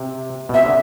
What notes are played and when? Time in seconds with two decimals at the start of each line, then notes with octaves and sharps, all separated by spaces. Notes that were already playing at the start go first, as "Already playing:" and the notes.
Already playing: C3
0.49 B2
0.54 C3 E5
0.66 D3